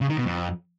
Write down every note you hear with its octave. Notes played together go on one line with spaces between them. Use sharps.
C#3
D#3
B2
F2